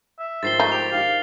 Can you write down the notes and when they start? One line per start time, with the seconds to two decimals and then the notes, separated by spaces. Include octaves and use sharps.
0.19 E5
0.43 G#2 D#3 F3 A6 C7 G7
0.60 A3 D#4
0.72 G4 F7
0.93 D#3 G4 F5